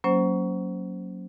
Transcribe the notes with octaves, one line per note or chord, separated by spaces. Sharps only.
F#3 A#3 C#4 C5